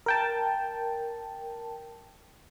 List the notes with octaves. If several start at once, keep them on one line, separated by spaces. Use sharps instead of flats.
A#4 G5 A5